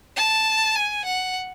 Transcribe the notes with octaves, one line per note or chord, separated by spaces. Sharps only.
A5
G#5
F#5